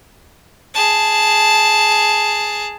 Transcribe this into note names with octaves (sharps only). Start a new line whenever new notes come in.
G#4 A5